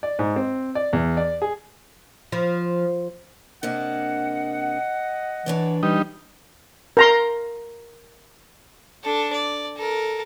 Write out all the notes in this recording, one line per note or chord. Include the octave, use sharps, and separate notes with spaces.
D5
G#2
C4
D5
E2
D5
G#4
F3
C3 A#3 D4 D#5 F#5
E3 D4 C#5 D5
E3 G3 D#4
A#4 A#5 C6
D4 A4
D5
A4 A#4